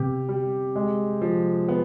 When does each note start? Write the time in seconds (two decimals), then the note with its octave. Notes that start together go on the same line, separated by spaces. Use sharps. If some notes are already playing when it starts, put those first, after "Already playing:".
Already playing: C3 B3 G4
0.29 G3
0.76 G#3
1.21 F3
1.69 B3